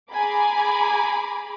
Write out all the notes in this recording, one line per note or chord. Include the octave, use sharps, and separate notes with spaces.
G#4 G#5 A#5 B5 D6